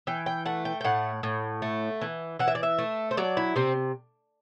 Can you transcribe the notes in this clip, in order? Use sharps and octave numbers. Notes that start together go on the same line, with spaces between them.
E3 G5
G5
A3 F#5
G5
G5
A2 F#5
A2
A3
E3
E3 F#5
E5
D5
E5
A3
C5
F#3 D5
E4
C3 C4